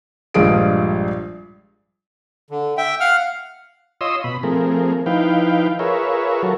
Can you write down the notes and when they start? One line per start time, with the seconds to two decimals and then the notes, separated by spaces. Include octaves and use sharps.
0.34 A#1 G2 G#3 F4 G#4 D7
2.50 D3
2.78 E5 G5
3.00 F5 F#5 F6
4.01 F4 C#5 D#5 C6 D#6 E6
4.24 B2 B5
4.43 F3 A3 C4 G#4 A#4
5.06 F3 D#4 E4 B4 F5 G5
5.79 F4 G#4 A#4 B4 C#5 E5
6.43 F#3 F#4 A4 A#4